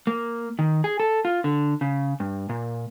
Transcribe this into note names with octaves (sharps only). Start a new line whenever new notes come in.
A#3
D#3
G#4
A4
F4
D3
C#3
G2
A#2